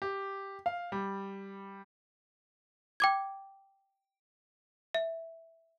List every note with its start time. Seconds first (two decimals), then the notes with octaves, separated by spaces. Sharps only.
0.02 G4
0.66 F5
0.92 G3
3.00 G5 D6 G#6
4.95 E5